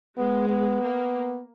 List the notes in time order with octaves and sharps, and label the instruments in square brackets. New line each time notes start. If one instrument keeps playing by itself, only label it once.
[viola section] G#3 [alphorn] B3
[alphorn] B3
[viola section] A#3